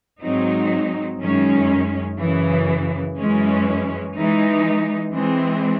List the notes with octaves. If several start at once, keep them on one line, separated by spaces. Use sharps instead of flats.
G#2 F#3 C4 D#4
F#2 D#3 G#3 C#4
F#2 C#3 E3
F#2 E3 G#3 C#4
E3 G#3 D#4
E3 G#3 C4